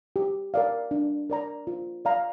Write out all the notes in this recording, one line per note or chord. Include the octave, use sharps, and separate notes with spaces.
G4
A#4 D5 F5
D4
A#4 D5 A#5
F4
D5 F5 A#5